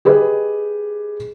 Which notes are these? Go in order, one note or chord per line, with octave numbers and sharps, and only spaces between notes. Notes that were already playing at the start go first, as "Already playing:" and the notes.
G4 G#4 B4 D#5